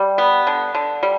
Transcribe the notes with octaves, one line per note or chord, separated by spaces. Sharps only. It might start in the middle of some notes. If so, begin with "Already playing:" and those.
Already playing: G3
B3
D3
D3
G3